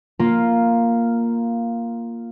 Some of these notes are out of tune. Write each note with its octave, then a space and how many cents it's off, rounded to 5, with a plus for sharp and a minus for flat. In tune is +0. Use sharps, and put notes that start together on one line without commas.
A#3 +0 F4 +0